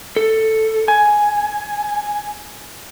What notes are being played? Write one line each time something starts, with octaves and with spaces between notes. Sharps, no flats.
A4
G#5